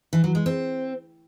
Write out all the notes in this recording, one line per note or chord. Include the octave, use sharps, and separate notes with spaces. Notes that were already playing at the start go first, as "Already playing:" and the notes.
E3
F#3
G#3
C4